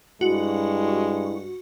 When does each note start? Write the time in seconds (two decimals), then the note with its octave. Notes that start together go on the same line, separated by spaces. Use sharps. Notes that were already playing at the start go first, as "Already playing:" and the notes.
0.21 G2 G#3 E4 F#4